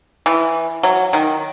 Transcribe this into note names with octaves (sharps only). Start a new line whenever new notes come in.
E3
F#3
D#3